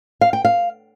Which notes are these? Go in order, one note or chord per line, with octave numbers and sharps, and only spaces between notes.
F5
G5
F5